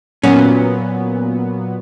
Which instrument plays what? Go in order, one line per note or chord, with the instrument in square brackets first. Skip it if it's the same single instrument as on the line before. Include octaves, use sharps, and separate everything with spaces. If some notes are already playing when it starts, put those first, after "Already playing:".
[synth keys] A#2 F#3 B3 [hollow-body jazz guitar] C#4